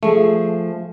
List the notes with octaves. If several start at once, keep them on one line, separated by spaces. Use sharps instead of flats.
F3 A3 G#4